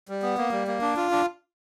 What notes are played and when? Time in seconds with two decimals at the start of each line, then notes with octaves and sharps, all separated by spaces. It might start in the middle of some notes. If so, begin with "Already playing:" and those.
0.09 G3
0.23 B3
0.38 A#3
0.52 G3
0.67 A#3
0.81 D4
0.97 F4
1.11 D4